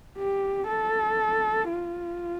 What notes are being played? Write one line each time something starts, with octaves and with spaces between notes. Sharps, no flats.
G4
A4
F4